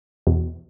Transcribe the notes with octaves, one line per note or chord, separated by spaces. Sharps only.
E2 B2